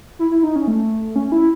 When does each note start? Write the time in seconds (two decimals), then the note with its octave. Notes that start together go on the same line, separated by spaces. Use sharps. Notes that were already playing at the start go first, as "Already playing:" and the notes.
0.19 E4
0.31 E4
0.44 D#4
0.56 C#4
0.68 A3
1.16 C#4
1.32 E4